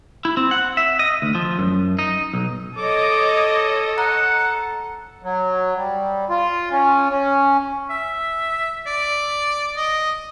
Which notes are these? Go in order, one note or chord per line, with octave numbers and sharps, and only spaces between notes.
E4
C4
F#5
E5
D#5
D2
F3
F#2
D#4
B1
A4 C#5 D#5 D6
F#5 A#5
F#3
G3
F4
C#4
C#4
E5
D5
D#5